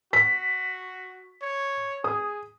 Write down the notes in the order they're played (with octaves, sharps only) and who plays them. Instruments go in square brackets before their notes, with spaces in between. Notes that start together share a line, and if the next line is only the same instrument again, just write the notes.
[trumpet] F#4 [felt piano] B6
[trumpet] C#5
[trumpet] G#4 [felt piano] D#6